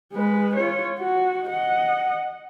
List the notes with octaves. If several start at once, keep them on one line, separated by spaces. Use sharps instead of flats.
G#3 B4
F4 C#5
F#4
D#5 F#5